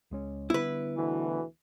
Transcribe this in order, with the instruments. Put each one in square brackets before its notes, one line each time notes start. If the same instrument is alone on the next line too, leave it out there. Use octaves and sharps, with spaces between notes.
[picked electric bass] C#2 G#3 C#4
[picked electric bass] D3 G3 B3 [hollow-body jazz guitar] E4 B4
[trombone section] D2 B2 E3